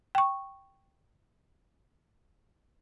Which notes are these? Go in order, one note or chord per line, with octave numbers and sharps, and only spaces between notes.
G5 C#6